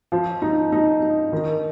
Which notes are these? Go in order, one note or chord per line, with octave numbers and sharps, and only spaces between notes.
F3
D#4
D#4
D#4
D#3